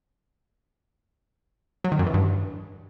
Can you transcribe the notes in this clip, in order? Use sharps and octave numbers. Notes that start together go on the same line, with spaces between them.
F#3
D#3
F#2
E3
G2